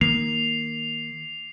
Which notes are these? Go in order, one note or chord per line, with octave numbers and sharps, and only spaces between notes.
D#3 A#3 C7 F7